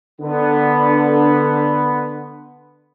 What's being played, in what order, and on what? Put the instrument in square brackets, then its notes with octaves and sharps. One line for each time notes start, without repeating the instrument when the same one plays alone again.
[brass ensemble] D3 B3